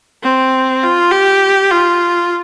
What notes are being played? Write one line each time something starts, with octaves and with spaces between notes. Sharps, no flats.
C4
F4
G4
F4